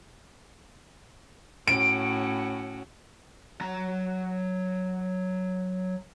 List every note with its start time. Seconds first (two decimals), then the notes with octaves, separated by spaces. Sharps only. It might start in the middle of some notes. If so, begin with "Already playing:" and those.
1.68 A2 C#4 F#4 D7
3.61 F#3 A#5